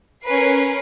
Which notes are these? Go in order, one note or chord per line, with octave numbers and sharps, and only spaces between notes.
C#4 A#4 B4 C7